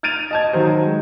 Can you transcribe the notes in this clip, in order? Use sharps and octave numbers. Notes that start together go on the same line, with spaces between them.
F6 G#6 A6 D7 D#7 F7
D#5 A5 G#6
D#3 F#3 C5
G#3